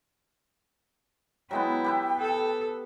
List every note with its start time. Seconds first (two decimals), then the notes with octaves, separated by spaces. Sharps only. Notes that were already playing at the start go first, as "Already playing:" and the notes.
1.51 F#3 G#3 B3 E4 G5
1.84 G4 B4 E5
2.20 A4